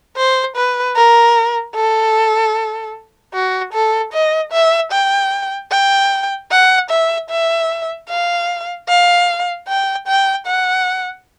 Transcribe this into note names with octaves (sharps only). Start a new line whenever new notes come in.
C5
B4
A#4
A4
F#4
A4
D#5
E5
G5
G5
F#5
E5
E5
F5
F5
G5
G5
F#5